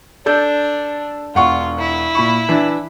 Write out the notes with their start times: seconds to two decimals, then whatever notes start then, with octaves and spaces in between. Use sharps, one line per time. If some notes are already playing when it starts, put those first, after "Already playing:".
0.26 D4 A4 D5 G6
1.35 E1 F4 F#5 C#6
1.79 E4
2.15 A#2 B5 C#6
2.49 E3 D4